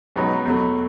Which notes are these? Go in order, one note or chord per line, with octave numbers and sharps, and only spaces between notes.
C#2 B2 F#3 B3 D#4
E2 B2 F#3 A3